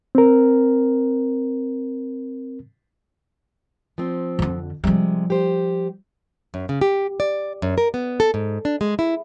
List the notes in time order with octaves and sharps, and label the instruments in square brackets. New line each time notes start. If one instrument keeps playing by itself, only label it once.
[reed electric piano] C4 A#4
[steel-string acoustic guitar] F3 C4
[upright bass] F2 D3
[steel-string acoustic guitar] C3 G#3 [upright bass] F3 G3
[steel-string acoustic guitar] G4 C5
[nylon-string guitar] F#2
C#3
G4
D5
F#2
A#4
B3
A4
G#2
D4
G#3
E4